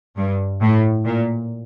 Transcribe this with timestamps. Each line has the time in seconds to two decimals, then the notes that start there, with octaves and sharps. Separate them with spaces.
0.17 G2
0.61 A2
1.05 A#2